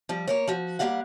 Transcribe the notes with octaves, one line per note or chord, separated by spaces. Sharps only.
F3 G3
A#3 A#4 C#5
F3 F#4
G3 A#3 G4 D#5 F5 F#5